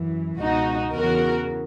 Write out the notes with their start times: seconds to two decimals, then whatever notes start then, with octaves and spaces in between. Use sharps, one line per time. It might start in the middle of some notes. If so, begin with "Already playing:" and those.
Already playing: F#2 E3
0.40 C#2 B2 D#4 F#4
0.94 E2 C#3 E3 F#4 A#4